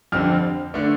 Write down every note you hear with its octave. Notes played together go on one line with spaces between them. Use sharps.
F2 D3 G3 C4 F6
D3 A3 D4